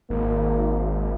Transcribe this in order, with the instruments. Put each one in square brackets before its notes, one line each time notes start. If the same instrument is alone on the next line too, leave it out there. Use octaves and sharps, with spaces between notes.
[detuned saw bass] G#1 [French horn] A#3